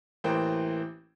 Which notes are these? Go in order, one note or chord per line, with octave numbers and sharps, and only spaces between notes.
A1 E3 A#3 C5 G5